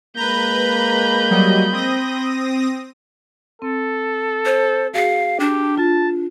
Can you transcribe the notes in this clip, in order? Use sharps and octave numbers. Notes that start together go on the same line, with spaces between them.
G#3 A#3 B4 A#5 B5 G6
F#3 G3 D#5
C4 D#6 A#6
C4 A4
C5
F#4 G#4 F5
D4 G4
F4 A5